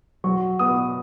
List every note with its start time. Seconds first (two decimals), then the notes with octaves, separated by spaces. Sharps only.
0.24 F#3 C#6
0.59 B3 D#6